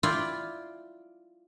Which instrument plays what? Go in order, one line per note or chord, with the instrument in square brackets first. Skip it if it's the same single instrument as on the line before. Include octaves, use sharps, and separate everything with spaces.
[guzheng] E4 F4 D5 G5